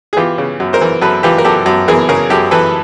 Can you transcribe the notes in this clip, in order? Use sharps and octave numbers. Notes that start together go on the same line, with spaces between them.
G#4
E3 F4 G4
C#3
F#2
A#4 C5
E3
F#2 A4 B4
E3 F4 G4
A#4
F#2 G4 A4
F#2
E3 G#4 A#4
C#3 G#4 A#4
F#2 G4 A4
E3 A4 B4